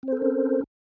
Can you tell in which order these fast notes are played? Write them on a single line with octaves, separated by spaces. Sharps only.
C4 C5 A4 A#4 C#4